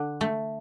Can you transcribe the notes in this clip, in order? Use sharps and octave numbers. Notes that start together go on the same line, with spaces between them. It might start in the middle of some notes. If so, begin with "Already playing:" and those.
Already playing: D3
A3